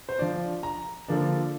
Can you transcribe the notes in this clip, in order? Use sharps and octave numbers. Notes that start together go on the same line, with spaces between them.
C5
F3 D4 D5
A#5
D3 F3 A#3 D4